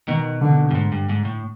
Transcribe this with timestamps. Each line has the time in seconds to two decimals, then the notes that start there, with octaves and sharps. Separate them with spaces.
0.08 B2 D#3
0.41 D3
0.71 G2
0.75 G#2
0.92 G2
1.09 G#2
1.25 A2